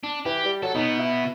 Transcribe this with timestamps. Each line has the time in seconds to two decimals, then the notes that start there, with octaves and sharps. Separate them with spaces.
0.04 D4
0.25 E3 G4
0.46 G3
0.63 F#3 A4
0.75 B2 B3 D#4
0.99 E4